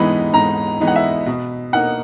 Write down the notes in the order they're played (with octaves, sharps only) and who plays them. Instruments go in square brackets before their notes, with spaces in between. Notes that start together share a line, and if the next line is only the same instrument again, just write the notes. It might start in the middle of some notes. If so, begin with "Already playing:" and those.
Already playing: [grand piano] G#2 E3 G#3 B3 D#4 [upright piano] B5
[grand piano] G#2 [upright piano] A#5
[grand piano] E3 G#3 B3 D#4
[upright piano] F#5
E5
[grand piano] B2
[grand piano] A#3 D#4 A#4 [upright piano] F#5